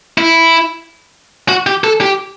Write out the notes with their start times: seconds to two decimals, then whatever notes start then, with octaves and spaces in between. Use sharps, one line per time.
0.18 E4
1.49 F#4
1.67 G4
1.84 A4
2.01 G4